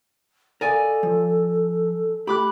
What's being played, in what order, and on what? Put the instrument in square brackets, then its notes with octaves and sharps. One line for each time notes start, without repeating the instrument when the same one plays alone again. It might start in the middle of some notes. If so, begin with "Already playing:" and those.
[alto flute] A4 [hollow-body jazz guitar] A#4 D#5 F5 [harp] D5 G#5
[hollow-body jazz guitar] F3
[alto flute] A3 [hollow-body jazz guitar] G4 [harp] B5 D6 F#6